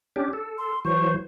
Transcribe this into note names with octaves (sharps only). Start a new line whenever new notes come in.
C#4 D4 G4
A4
C6
E3 F#3 C5 C#6